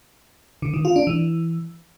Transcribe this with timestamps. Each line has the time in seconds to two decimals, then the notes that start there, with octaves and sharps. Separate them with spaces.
0.62 D3
0.74 D#3
0.85 F4
0.96 D4
1.07 E3